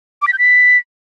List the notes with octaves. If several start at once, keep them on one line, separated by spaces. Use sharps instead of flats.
D6
B6
G6
B6